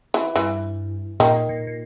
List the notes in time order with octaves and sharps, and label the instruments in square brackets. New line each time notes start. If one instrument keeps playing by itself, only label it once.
[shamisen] E3
[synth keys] G2 [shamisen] E3
[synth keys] A#2 [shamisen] D#3
[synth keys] A#2
A#2